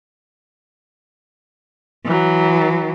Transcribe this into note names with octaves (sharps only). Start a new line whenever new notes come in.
E3 F#3